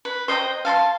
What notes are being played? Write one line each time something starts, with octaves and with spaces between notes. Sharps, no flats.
B4
C5 D#5 G5 A#5
F5 A5 A#5 C6